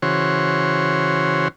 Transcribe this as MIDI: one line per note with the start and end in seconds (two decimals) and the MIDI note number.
0.02 1.48 49
0.02 1.48 52
0.02 1.48 66
0.02 1.48 72
0.02 1.48 73